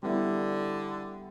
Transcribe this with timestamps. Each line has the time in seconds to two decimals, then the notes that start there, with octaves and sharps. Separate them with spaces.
0.03 D3 G3 B3 E4